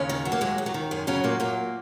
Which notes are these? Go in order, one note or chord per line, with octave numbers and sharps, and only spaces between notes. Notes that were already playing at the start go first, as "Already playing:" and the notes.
Already playing: D#2 C#3 C#4
D#3
F#3
A#3
D#2 G#3
D#2
F#3
D#3
F#2 G#3
C#3 F#3 C#4
F#2 A#2 A#3
A#2 F#3 A#3